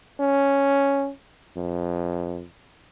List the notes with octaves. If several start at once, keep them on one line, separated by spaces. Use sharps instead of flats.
C#4
F2